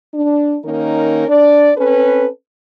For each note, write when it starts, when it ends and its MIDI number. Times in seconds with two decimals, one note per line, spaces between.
0.14 0.57 62
0.65 1.27 51
0.65 1.27 58
0.65 1.27 61
0.65 1.27 63
0.65 1.27 70
1.28 1.71 62
1.28 1.71 74
1.77 2.27 60
1.77 2.27 61
1.77 2.27 69
1.77 2.27 71